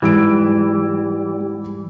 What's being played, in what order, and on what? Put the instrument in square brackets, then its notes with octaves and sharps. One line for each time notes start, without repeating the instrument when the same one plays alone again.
[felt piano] G#2 E6 D7 [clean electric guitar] E3 [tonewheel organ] G3